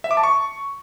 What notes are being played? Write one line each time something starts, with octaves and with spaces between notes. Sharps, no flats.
E5
D6
A5
C#6